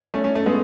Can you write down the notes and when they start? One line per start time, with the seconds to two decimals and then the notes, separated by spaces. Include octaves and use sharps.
0.14 A3 C#4
0.24 A3 C#4
0.35 A3
0.46 G#3 B3